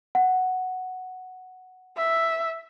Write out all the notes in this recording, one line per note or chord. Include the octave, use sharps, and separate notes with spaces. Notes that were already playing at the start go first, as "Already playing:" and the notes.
F#5
E5